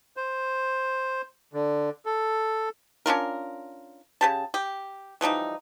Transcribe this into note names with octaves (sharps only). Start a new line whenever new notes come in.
C5
D3
A4
C#4 D4 F4 A#4
C#3 G4 A5
G4
E3 F3 G3 D#4